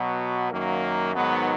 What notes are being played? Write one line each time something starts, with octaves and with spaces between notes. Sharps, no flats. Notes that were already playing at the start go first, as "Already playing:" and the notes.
Already playing: B2 F#3 B3
F#2 D#3 F#3 A#3
G#2 D#3 F#3 B3